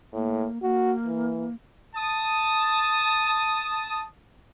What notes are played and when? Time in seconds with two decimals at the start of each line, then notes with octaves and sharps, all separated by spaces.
0.13 A2 A#3
0.62 A#3 F#4
1.07 E3
1.95 A5 D#6